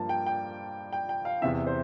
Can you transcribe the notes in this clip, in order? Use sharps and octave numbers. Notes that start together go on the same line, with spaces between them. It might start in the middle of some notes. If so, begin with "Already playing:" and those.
Already playing: G2 F3 A#3 A5
G5
G5
G5
G5
F5
E2 C3 E3 E5
C5